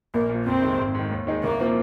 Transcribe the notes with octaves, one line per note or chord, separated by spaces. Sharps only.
A#1 A#3
A#2 F3
F2 C4
C3 D#3 G#3
G#1
G#2 D#3
D#2
D#3 G#3 D#4 G#4
C2 A#3
A#2 F3 C4